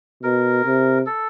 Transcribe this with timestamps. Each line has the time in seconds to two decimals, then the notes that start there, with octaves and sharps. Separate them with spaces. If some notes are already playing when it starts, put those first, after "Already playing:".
0.23 B2 A#4
0.65 C3
1.06 A4